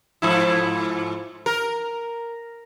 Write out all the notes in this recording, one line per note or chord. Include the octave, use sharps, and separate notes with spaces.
G#2 F3 E4
A#4